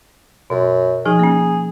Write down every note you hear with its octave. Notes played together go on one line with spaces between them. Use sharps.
F#2 B2
F3 D#4 G#4
A#3 C#4